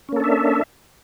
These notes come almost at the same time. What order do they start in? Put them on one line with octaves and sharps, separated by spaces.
C#4 A#3 A4 D4 E5